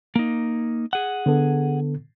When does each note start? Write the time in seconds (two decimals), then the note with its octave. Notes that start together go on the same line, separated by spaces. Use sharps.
0.16 A#3 D#4
0.93 G#4 F#5
1.26 D3 B3 A4